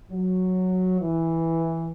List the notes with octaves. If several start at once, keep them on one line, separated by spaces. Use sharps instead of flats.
F#3
E3